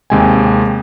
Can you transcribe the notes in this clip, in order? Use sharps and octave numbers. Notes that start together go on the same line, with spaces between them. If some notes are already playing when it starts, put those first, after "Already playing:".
D#2 C3 G#3 G5 G#5